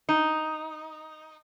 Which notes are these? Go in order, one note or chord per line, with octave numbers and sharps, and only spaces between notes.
D#4